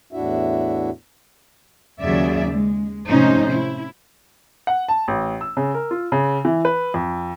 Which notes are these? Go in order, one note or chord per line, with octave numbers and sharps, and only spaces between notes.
E2 A2 D4 E4 F#4 E5
D#2 C#3 F#3 G#4 D5 E5
G#3
A2 C3 F3 C#4 D#4 C5
E4
F#5
A5
A1
E6
C#3
A#4
F4
C#3
E3
B4
F2